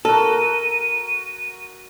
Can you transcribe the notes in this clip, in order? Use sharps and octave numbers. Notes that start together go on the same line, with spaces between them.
F#4 A4 A#4 D#7